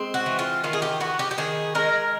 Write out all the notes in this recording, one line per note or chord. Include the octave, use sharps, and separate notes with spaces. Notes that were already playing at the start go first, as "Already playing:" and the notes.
Already playing: G#3 C4
F#4
E3
F4
D#3 F4
G#4
G4
B3 F#4
G4
G4
D#3 G#4
G#3 A#4